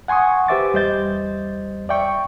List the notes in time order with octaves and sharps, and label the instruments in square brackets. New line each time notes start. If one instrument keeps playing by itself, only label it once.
[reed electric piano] F#5 G#5 C6 C#6 D#6
G4 B4 C5 E5 D6 A6
E2 G3 C5 D#5 G6 A6
D5 E5 G5 C#6